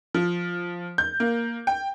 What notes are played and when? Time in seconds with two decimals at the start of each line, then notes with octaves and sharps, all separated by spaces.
0.14 F3
0.98 G6
1.20 A#3
1.67 G5